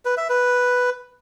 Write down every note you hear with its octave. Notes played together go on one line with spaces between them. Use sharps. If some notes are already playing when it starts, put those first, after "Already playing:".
B4
E5
B4